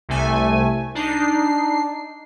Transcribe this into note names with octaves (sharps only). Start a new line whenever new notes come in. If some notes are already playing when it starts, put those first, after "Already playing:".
C2 C3 A3 G#5
D4 D#4 C7